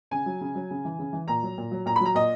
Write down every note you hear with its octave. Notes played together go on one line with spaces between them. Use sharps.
C#3 G#5
F#3
C#3
F#3
C#3
E3
C#3
E3
A#2 A#5
F#3
A#2
F#3
A#2 A#5
B5
F#3
A#5
A#2 D#5